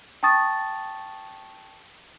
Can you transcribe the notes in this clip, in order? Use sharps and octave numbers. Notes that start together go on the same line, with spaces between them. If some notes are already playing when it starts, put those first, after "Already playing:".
G5 A5 C#6 D#6 A6